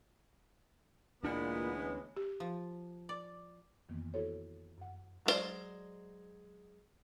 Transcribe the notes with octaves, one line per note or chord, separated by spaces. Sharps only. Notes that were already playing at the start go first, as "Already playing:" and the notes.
D2 A#2 E3 G#3 B3 D4
C#4 B4 C#5
G4
F3
D5
F2 D#3 E3 A#3 B3
E4 F#4 A4 C5 C#5
F#2 F#5
F#3 G#3 B3 C5 D5